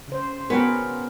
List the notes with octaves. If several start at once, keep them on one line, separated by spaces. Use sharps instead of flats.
C#3 C5
B3 C#4 F#4 A#4 G5